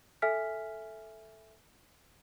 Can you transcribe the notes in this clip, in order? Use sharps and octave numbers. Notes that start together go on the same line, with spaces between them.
A4 E5 G#5 F6 B6